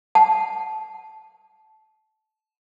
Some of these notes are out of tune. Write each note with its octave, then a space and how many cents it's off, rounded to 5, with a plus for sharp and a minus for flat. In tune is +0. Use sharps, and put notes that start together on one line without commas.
F#5 +0 A5 -20